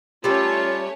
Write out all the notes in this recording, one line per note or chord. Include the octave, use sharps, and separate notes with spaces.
G3 A3 C#4 F4 A4 A#4 C#5